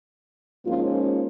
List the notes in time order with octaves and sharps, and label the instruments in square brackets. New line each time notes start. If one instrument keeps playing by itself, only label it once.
[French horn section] G#2 F3 A#3 C#4 F4